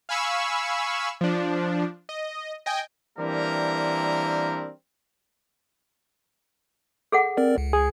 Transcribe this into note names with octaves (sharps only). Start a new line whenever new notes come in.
F5 G#5 B5 C#6 E6
F3 D4
D#5
D#5 G5 G#5
E3 G3 A#3 C4 D4 A#4
G#4 A4 F#5
C4 A#4 D5
C#2
G#4